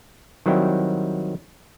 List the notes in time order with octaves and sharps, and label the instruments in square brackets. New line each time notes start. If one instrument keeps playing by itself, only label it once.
[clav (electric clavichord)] D#3 F#3 G3 C4 E4